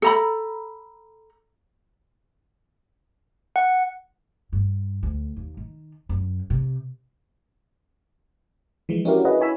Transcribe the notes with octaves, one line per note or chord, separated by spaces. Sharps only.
A4 A#5 B5
F#5
G2
D2
D#2
D#3
F#2
C3
E3 F3 G#3
C#4 D4 E4 F#4 G4 A#4
E4 F#4 G#4 B4 D#5
E4 C#5 G#5 B5 E6